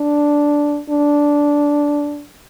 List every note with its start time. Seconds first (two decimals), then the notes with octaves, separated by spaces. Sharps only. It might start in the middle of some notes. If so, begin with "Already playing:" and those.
Already playing: D4
0.90 D4